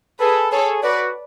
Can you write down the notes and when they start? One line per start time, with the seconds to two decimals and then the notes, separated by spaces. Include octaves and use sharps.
0.19 G#4 A4 B4
0.51 G#4 A4 C#5
0.83 F#4 B4 D5